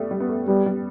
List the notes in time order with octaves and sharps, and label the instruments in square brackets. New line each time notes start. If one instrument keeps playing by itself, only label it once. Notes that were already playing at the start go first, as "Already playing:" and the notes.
Already playing: [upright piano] G3 A3 B3
G3
B3
A3
[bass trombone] G3 [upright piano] B3
[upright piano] G3